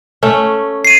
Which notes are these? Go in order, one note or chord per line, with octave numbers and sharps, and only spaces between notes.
A3 C#4
C7 D#7